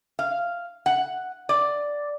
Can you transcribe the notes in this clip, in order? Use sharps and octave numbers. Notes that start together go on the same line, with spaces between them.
F5
F#5
D5